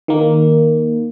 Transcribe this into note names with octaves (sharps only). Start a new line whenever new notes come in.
D#3 A#3